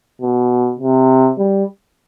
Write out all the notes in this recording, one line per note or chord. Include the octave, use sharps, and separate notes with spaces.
B2
C3
G3